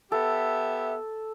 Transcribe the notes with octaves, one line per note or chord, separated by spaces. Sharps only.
B3 G4 A4 E5